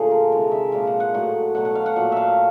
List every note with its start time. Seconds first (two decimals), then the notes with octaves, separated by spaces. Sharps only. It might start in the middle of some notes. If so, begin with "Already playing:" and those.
Already playing: A#2 D3 F3 A3 G#4 C#5
0.11 A#4
0.32 C3 D#3 G#3 A#4
0.51 E5
0.72 A#2 F3 G#3 F5
0.87 F#5
1.00 F#5
1.14 A2 F#3 A3 F#5
1.55 B2 F#3 A3 F#5
1.65 F#5
1.75 F5
1.86 F#5
1.96 A#2 F#3 A3 F#5
2.12 E5 F5